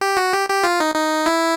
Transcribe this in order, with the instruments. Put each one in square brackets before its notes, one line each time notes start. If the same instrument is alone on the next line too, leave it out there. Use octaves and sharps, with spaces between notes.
[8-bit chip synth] G4
F#4
G4
G4
F4
D#4
D#4
E4